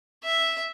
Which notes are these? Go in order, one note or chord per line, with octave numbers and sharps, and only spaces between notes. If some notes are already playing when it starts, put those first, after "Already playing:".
E5